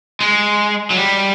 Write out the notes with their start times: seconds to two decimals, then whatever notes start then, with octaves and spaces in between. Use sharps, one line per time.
0.21 G#3
0.90 F#3
0.97 G3